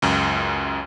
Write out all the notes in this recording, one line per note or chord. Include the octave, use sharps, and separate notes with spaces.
C#2 F#2